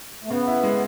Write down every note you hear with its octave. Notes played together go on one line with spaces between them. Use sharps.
A3
C#3 B3
E4
G#3